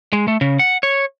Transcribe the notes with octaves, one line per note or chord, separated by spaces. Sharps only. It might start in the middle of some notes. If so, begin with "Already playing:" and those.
G#3
A3
C#3
F#5
C#5